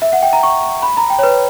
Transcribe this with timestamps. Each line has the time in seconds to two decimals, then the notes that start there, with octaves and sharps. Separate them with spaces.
0.02 E5
0.13 F#5
0.22 G5
0.33 A#5
0.43 C#6
0.82 B5
0.97 A#5
1.10 G5
1.19 C#5
1.23 B4